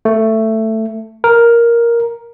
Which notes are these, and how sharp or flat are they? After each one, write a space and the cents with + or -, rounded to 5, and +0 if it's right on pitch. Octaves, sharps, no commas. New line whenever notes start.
A3 +10
A#4 +5